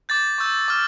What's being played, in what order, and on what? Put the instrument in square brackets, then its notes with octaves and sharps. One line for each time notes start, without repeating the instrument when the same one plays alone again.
[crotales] D6 G6 A6
C#6 E6 G6
D6 F6